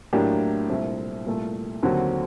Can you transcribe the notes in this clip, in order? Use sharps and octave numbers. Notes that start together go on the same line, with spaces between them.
A2 F#3 A#3 D4 G4
C2 A#2 A3 C4
C2 A#2 A3
D#2 D3 F#3 C4 F#4